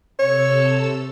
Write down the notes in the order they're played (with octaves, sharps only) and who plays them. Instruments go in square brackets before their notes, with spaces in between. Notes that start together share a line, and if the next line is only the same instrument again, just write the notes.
[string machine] C3 A4 E6 [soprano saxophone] C#5